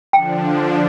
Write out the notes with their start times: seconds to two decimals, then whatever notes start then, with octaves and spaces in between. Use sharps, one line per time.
0.13 D3 F3 D4 G5